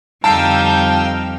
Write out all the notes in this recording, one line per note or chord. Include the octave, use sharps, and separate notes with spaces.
F2 D3 G3 D#4 F5 G5 A5 E6